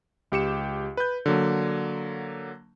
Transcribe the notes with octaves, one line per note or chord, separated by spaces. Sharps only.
C#2 G4 C#7 E7
B4 G6
D3 F#3 A#3